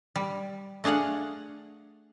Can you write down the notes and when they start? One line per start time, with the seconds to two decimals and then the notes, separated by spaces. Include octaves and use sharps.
0.16 G3
0.84 A3 D4 G#4 F5 F#5